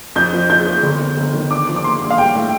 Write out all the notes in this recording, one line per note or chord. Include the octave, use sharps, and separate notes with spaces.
F2 G6
F3
F3 G6
F3
G1
F2
G1
D#3
D4 D6
F3
D6
A#3 C6
G2
F5
G3 G5
A2